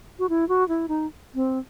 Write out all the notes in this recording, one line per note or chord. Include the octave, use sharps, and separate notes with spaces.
F#4
E4
F#4
E4
D#4
C4